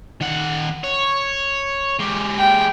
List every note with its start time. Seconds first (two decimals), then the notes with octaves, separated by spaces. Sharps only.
0.21 D#3 F#5
0.84 C#5
2.00 G#3 G4
2.38 G5